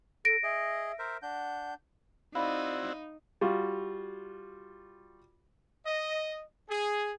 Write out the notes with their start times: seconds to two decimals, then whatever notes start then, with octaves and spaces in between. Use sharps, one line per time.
0.25 A4 A#6 D7
0.43 G#4 D#5 E5
0.99 A#4 C5 E5
1.22 D4 F#5 G6
2.35 C4 D#4 E4 F#4 D5 F5 B5
3.41 G3 F4 F#4
5.86 D#5
6.69 G#4